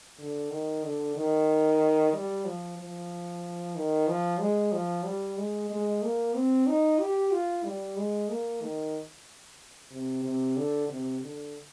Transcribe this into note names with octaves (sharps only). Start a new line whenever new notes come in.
D3
D#3
D3
D#3
G3
F3
F3
D#3
F3
G#3
F3
G3
G#3
G#3
A#3
C4
D#4
G4
F4
G3
G#3
A#3
D#3
C3
C3
D3
C3
D3